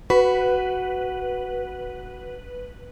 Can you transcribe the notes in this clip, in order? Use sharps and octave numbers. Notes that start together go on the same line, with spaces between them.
F#4 B4